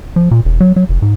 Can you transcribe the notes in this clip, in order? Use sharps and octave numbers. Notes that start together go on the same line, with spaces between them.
F3
A#2
E1
F#3
F#3
F1
G#2